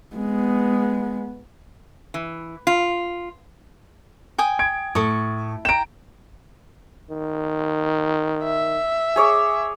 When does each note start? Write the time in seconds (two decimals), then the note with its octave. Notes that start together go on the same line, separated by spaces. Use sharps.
0.16 G#3 B3
2.14 E3
2.67 F4
4.38 G5 G#5 D#6
4.59 G#6 D7
4.95 A2 A4 C#6 D#6
5.65 G5 A#5 D7 E7
7.10 D#3
8.43 E5
9.16 G#4 C#5 D6